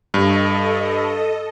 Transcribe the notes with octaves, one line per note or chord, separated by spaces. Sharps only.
G2 A4 D#5